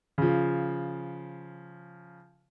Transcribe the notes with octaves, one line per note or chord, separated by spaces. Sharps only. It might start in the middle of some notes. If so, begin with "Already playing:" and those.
C#3 F3